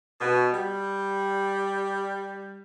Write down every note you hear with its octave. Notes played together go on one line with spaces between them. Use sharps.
B2
G3